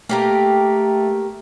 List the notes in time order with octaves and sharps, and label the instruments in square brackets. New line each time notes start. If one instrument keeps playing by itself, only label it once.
[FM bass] A3 [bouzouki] A#3 G4 A#4